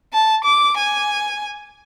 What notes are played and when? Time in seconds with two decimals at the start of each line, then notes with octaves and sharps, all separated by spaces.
0.13 A5
0.45 D6
0.77 G#5